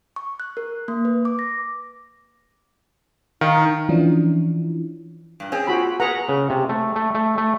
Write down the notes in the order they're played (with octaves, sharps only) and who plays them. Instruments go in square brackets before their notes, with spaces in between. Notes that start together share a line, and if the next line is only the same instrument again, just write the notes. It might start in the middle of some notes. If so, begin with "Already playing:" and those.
[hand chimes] C#6
F#6
A#4
A#3
B4
D6
A#6
[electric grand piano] D#3 F5 [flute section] D#4
[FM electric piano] E3 F3 C#4 D4 E4
[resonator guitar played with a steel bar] G2 A#2
C4 C#4 G#4
[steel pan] F4 F#4 B5
[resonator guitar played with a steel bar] B3 A#4 B4 [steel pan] G#4 F#5 A#5
[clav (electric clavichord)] C#3
C3
A3
A3
A3
A3